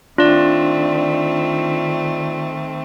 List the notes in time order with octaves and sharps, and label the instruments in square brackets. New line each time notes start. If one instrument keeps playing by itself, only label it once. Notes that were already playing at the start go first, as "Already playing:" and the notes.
[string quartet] D#3 A3 C4 [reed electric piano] D4 [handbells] F4 D5